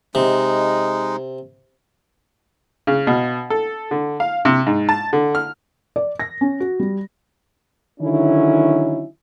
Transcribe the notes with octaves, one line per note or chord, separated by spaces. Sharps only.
C3 G#3 D#4
C#3
B2
A4
D3
F5
C3
G#2
A5
D3
F6
D5
A#6
C#4
F#4
G3
D3 D#3 F#3 C#4 D#4 E4